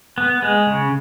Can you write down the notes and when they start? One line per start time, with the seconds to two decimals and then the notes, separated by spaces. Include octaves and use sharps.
0.18 B3
0.42 G#3
0.67 C#3